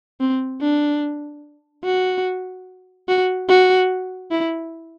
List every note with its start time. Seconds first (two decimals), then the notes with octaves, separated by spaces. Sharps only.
0.20 C4
0.61 D4
1.84 F#4
3.08 F#4
3.49 F#4
4.31 E4